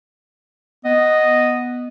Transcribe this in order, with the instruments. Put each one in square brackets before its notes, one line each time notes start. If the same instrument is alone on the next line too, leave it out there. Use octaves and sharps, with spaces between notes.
[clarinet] B3 [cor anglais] D#5